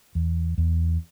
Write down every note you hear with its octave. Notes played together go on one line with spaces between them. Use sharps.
E2
E2